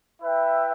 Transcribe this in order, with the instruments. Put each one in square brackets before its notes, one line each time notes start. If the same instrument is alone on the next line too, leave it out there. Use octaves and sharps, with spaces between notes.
[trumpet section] E4 B4 E5 G5